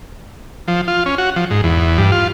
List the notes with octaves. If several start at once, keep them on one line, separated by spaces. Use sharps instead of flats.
F3
F4
C#4
F#4
F3
G#2
E2
G2
F4